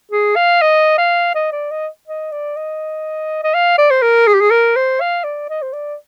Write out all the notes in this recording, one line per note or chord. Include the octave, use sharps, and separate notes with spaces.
G#4
F5
D#5
F5
D#5
D5
D#5
D#5
D5
D#5
D#5
F5
D5
C5
A#4
G#4
G4
G#4
A#4
C5
F5
D5
D#5
C5
D5